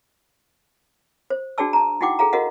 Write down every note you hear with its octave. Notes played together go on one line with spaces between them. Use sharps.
C5
D4 F#4 G#4 D5 A5 E6
A5 A#5
D#4 E4 F#4 F#5 G5 D6
G#4 A4 F5 A#5
F#4 A#4 D#5 F5 F#5